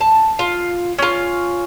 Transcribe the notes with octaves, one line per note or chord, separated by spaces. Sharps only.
A5
F4
C#4 F4